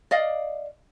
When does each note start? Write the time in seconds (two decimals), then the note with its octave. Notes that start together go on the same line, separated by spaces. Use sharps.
0.11 D5 D#5 F5